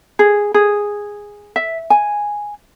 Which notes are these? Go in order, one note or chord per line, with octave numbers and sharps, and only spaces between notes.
G#4
G#4
E5
G#5